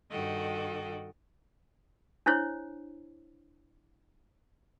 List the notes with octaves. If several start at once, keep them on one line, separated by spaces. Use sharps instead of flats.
G2 D#3 F#4 A4 D#5 G5
D4 E4 C5 C#5